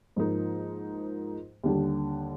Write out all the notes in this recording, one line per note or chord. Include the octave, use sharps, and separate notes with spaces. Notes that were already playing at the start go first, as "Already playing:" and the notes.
G#2 F3 A#3 D#4 A#4
D#2 D3 G3